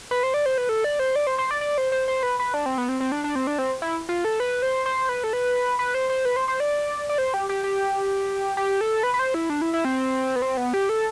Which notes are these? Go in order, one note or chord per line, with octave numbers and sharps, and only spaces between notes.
B4
C5
D5
C5
B4
A4
D5
C5
D5
C5
C5
D5
D5
C5
C5
C5
B4
B4
D4
C4
B3
C4
C4
D4
D4
C4
D4
C4
E4
F4
A4
B4
C5
C5
B4
A4
B4
B4
C5
C5
B4
C5
C5
D5
D5
C5
G4
G4
G4
G4
A4
B4
B4
C5
E4
D4
E4
E4
C4
B3
C4
B3
G4
A4